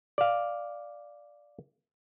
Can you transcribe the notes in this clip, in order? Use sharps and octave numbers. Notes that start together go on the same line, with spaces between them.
D5 F5